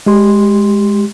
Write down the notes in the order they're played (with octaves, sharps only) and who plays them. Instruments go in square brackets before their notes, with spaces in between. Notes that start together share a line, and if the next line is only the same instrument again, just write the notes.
[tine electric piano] G#3 G4 C6